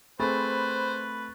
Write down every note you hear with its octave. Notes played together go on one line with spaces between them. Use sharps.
A3 C4 G#4 B4 C5 B5 C#6 A6